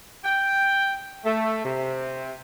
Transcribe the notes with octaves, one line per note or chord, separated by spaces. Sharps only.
G5
A3
C3